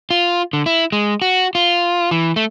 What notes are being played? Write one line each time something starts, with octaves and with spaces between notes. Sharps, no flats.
F4
D3
E4
G#3
F#4
F4
E3
A3